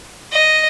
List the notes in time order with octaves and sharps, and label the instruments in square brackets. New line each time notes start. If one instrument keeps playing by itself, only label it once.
[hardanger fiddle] D#5